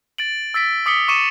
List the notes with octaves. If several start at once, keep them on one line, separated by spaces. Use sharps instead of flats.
A6 D7 F#7
E6 A6 B6 D7
D6 D#6 B6 C#7 G7
C#6 D6 C#7 D#7 E7